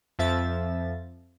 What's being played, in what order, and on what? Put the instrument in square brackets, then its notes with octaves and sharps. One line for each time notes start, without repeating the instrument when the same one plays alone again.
[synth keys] F2 F3 E5 A6